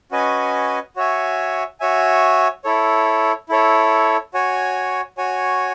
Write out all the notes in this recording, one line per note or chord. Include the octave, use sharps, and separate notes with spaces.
C#4 F#4 B4 D#5 G#5
F#4 C#5 E5 G#5
F#4 C#5 E5 G#5
E4 A4 C#5
E4 A4 C#5
F#4 C#5 G#5
F#4 C#5 G#5